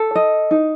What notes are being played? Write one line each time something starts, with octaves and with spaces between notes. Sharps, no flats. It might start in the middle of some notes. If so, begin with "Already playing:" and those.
Already playing: A4
D#5
D#4